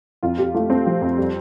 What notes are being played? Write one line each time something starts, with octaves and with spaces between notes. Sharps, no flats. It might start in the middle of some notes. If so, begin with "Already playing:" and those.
F2 F4
F2 G4
A3 F4
A3 C4
F3
F2
G3